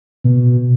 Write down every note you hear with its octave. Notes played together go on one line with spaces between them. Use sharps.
B2